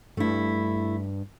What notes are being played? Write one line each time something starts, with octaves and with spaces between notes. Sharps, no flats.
G2 A3 E4